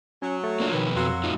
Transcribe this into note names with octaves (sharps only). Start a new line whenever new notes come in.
F#3 C#4
A3
A#3 D4 F4
B2 D#3 F3 B4
F2 F#3 A#3 F#4 C6 E6
A2 D#4 F4